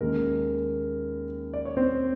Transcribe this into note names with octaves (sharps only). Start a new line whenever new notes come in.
D#2 D#3 G#3 A#3 C#4 A#4
D5
C#5
C4 C5